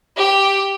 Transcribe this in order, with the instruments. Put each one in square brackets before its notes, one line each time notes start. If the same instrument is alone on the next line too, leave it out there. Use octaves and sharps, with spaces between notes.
[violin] G4